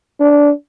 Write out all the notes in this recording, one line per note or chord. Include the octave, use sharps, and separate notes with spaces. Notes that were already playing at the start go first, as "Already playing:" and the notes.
D4